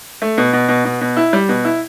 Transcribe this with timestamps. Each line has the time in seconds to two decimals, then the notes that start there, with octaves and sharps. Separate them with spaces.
0.22 A3
0.38 B2
0.53 B2
0.68 B2
0.85 B2
1.01 B2
1.17 E4
1.33 G3
1.49 B2
1.65 E4